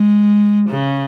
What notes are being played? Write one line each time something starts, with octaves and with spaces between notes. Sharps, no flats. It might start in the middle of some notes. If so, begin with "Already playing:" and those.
Already playing: G#3
C#3